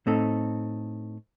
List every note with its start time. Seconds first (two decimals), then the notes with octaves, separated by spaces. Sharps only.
0.06 A2 A3 C4 D#4 A4